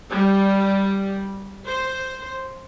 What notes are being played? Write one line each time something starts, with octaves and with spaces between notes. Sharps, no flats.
G3
C5